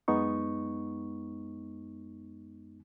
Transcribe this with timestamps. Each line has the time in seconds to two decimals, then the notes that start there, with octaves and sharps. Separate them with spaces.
0.08 F#2 G#3 B3 D#4 C#6